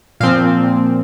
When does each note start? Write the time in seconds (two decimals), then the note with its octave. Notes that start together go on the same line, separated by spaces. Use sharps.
0.20 A#2 F3 C4 F5